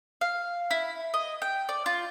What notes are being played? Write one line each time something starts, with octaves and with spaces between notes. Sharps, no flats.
F5
E4
D#5
G5
D5
F4